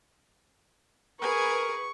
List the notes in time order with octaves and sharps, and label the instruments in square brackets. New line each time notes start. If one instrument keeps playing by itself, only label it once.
[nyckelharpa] G#4 G#5 [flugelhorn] A#4 [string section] B4 [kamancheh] C#6